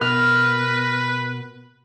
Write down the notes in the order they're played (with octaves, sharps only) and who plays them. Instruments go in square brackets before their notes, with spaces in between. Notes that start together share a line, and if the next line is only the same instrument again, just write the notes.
[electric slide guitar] B2 [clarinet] A#4 [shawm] B4 [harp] F6